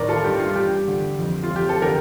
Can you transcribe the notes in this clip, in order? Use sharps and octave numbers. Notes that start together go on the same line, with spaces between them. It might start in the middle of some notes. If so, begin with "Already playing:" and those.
Already playing: A2 D#3 A#4 D5
F4 A4
G2 G4
F4
G2 G4
D3
F2
F4
F2
G4
A4
D3 G4 A#4